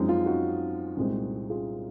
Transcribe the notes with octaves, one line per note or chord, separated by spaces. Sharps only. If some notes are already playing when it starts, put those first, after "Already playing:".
Already playing: F#2 F3 G#3 C4 D#4
F4
D#4 F#4
C2 A#2 G#3 C4
F4 G#4